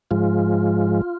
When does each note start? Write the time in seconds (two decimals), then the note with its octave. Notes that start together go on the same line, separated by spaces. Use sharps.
0.11 G#2 F3 G#3 F4